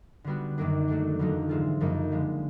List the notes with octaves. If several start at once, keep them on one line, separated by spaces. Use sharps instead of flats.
D3 G3 B3 D4 F#4
F#2 D#3 F#3 A#3 D4
F#3 A3 D4
F2 D3 F#3 A#3 D#4
G#2 E3 G#3 C4 F4
F#2 C#3 F3 A#3 D#4
D3 F3 G#3